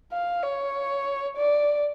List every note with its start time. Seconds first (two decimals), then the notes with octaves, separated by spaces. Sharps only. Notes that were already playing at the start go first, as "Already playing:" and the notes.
0.12 F5
0.43 C#5
1.37 D5